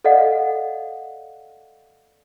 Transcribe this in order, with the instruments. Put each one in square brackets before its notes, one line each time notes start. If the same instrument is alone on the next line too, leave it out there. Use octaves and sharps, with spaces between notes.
[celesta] A4 D5 D#5 F5 F#5